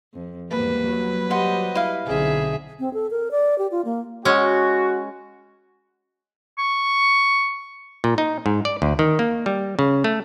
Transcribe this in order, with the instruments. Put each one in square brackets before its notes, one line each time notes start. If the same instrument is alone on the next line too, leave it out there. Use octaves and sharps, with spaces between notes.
[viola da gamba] F2
[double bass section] E2 G#2 [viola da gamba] G3 A#3 [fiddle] B4
[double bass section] F#3
[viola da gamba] G3 G4 D#5 [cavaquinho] C5 F#5
[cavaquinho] E4 F5
[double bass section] B1 D3 [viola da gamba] C4 D#4 [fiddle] G#4 E5
[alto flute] C4
A4
A#4
D5
G4
F4
A#3
[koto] G#3 C#4 [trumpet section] F#4
[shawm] C#6
[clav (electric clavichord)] A#2
D#4
G#2
D5
D2
D#3
A#3
G3
C#3
A3